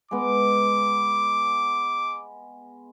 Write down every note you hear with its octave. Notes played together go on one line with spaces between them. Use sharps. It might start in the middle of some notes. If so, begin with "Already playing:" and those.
G#3 B3 D6